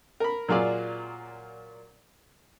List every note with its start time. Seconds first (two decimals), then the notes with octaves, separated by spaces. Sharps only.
0.20 A#4 B5
0.49 A#2 F#3 F4 G#4 D5